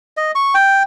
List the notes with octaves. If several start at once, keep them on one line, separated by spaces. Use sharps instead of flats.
D#5
C#6
G5